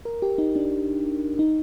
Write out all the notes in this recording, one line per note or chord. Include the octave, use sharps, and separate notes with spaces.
A#4
G4
D#4
D4
D#4